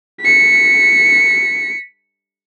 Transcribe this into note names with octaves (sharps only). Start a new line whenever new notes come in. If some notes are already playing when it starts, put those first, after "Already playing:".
B6 C#7